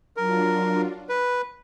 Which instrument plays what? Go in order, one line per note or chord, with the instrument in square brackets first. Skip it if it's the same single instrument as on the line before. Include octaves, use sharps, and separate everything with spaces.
[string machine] F#3 D4 F4 [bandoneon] A#4
[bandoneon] B4